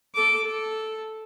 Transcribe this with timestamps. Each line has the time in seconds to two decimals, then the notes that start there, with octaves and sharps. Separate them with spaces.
0.15 A4 D6
0.46 A4